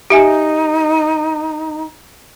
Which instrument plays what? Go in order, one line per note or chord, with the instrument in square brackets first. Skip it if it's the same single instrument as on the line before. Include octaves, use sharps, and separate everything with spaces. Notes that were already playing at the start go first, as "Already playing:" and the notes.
[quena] D#4 [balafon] G4 E5 G#5